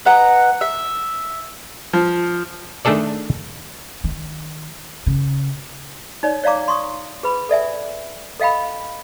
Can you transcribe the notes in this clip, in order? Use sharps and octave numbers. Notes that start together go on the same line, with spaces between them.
B4 D#5 F#5 A#5
E5
F3
D#3 A3 D4 G#4 A4 D5
D#3
C#3
D#4 C#5 D5
C#5 D5 F5 A#5 D6
C6 C#6 D#6
G#4 B4 B5
A4 D5 E5 G#5
A4 D#5 F5 G5 B5